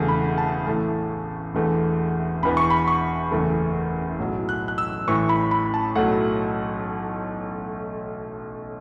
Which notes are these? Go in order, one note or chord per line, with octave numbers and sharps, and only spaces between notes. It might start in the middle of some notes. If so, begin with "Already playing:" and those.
Already playing: E1 E2 C#3 A3
B5
A5
A1 A2 A3 A5
E1 E2 E3 A3
E1 E2 E3 B3 B5
C#6
B5
C#6
F#1 E2 E3 A3
B1 A2 F#3
F#6
F#6
E6
A1 A2 E3 C#6
B5
B5
A5
B1 A2 F#3 A3 F#5